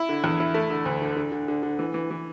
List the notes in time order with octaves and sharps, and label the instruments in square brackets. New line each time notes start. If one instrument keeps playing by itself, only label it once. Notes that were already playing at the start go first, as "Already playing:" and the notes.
Already playing: [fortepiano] E4
D3
E2
E4
A3
D3
D2
D3
D3
D3
D3
D3
E3
E3
E3